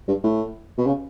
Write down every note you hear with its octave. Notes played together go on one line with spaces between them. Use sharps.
G2
A2
B2
C#3